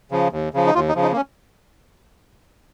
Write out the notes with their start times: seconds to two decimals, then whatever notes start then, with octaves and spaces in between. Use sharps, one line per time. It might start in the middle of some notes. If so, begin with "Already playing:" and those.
0.11 C#3 F3
0.32 D#2
0.54 C#3 F3
0.67 D#4
0.75 D#2 F4
0.89 D#4
0.95 C#3 F3
1.02 D#4
1.12 A#3
1.16 C#4